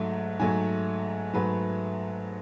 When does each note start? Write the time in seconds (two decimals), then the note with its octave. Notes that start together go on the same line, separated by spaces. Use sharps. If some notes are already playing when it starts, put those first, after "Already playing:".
Already playing: G#2 F#3 A3
0.40 G#2 F#3 A3 G#5
1.33 G#2 F#3 A3 B4